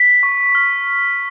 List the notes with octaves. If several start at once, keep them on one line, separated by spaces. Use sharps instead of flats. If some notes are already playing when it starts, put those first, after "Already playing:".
Already playing: B6
C#6
F6